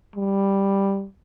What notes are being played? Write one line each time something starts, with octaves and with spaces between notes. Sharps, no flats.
G3